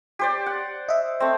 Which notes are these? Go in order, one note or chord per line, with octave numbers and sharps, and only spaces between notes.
G4 C5 D5
F#5
D#5 E5
A3 C4